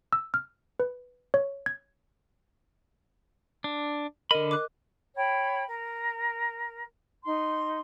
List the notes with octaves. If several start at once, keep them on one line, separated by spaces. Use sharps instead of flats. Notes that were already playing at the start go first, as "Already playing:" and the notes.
E6
F6
B4
C#5
G#6
D4
D3 A#4 D#5 B5 D#7
D6 F#6
C#5 G5 B5
A#4
D#4 C6